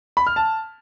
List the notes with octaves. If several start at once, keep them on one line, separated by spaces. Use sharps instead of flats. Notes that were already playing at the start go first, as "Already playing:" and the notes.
B5
F6
A5